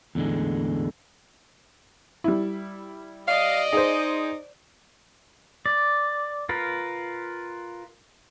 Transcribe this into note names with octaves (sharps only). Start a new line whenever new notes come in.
E2 A2 D3 G#3
G3 E4
D5 D#5 F5
D#4 G#4 C5
D5
F4 A#4 B4